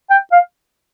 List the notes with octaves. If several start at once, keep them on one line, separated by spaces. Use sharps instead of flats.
G5
F5